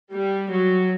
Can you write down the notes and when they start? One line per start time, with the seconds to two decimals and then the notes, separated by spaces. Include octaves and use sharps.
0.12 G3
0.49 F#3